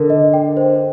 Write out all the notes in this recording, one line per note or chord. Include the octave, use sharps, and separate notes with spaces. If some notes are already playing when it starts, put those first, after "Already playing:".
Already playing: D3 A#4
D#5
G5
C5